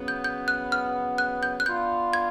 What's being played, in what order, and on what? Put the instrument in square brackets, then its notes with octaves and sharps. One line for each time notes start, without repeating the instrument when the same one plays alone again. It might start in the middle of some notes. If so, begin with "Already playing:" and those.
Already playing: [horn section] C#3 F#3 B3
[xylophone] G6
G6
F#6
F6
F#6
G6
F#6
[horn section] B3 D4 F4 [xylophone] G6
[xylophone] G#6